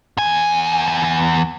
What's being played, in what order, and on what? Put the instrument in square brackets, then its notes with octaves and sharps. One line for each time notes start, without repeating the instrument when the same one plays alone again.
[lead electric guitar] E2 G#5